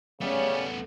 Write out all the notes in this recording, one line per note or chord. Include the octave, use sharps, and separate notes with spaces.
C#3 A3 B3 C#4 G4 D5